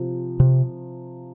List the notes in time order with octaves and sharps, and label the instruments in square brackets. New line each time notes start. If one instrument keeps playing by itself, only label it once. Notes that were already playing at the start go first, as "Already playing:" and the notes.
Already playing: [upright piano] C3 F3
[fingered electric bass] C3